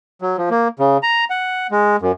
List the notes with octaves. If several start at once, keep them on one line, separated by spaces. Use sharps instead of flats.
F#3
F3
A#3
C#3
A#5
F#5
G#3
F#2